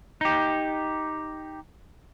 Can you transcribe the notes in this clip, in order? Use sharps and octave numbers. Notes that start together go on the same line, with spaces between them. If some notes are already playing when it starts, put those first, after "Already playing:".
D#4 G4